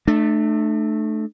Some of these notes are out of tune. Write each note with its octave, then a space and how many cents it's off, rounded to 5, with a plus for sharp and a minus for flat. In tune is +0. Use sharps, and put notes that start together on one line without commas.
A3 -10 D4 +40